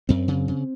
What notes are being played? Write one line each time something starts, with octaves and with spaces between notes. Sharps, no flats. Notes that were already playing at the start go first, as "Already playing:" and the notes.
F#2 C4
C#3
C#3